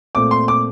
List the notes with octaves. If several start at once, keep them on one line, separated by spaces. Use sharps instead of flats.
A#2 A3 C4 D6
C6
D6